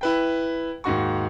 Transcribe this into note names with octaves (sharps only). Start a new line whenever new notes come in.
E4 B4 G5
D#2 G#2 F#4 C#6